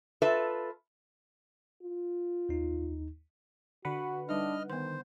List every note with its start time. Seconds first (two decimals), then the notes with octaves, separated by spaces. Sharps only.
0.22 F4 A4 B4 E5
1.83 F4
2.49 D#2 D#4
3.85 D3 F#4 B4 F#5
4.29 G3 D4 D#4 D#5 F6
4.70 D#3 B3 C5 C6